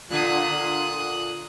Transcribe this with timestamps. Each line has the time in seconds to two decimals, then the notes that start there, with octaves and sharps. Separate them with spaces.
0.11 A#2 D3 F4 D#6 F#6